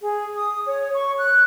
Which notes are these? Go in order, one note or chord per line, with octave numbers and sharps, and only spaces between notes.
G#4
D#6
C#5
C#6
F#6